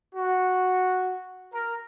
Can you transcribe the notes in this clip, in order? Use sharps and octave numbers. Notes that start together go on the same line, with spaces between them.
F#4
A#4